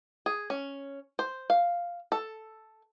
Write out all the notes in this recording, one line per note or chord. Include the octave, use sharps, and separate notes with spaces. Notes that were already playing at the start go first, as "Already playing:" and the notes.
G#4
C#4
C5
F5
A4